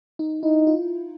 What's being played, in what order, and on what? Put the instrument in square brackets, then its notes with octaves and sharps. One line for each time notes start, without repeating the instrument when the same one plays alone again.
[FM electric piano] D#4
[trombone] D#4 [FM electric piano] E4
[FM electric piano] F4